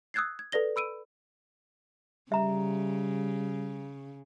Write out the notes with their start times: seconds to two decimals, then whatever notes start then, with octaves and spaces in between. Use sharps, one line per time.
0.14 D#6 E6 F#6 G#6 A6 C7
0.39 G#6
0.52 A4 B4 D5 A#6 G7
0.76 B5 E6 D7 D#7
2.32 C#3 G3 E5 A#5